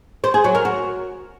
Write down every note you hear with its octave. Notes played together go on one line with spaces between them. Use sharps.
C5
G#4
F#3
A#4
F#4